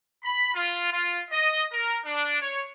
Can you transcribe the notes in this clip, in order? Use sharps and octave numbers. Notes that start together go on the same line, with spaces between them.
B5
F4
F4
D#5
A#4
D4
C#5